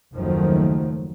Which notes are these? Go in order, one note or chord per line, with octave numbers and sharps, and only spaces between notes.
F#1 D#2 D#3 F3 F#3 A3